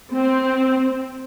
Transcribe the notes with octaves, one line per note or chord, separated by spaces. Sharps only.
C4